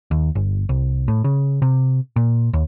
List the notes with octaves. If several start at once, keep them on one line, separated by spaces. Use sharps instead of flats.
D#2
G1
C2
A2
C#3
C3
A#2
D#2